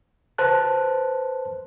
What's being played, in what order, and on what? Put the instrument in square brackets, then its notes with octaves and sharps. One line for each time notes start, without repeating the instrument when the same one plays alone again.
[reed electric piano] B4 C5 A5 F#6